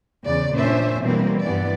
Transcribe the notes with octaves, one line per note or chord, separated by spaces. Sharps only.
E2 C#3 D5
A#2 C#4 D4 C5 E5
B2 E3 G3 A#3 C4
G2 E3 B3 D5